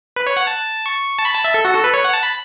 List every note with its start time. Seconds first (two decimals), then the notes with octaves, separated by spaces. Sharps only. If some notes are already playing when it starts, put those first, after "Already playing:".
0.16 B4
0.27 C#5
0.37 F#5
0.47 A5
0.86 C#6
1.19 A5
1.25 B5
1.35 A5
1.44 E5
1.54 A4
1.65 F#4
1.75 A4
1.84 B4
1.94 C#5
2.04 F#5
2.13 A5
2.23 B5